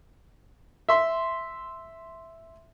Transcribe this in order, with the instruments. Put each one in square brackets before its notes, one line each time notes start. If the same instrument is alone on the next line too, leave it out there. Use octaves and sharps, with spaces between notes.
[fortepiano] E5 C6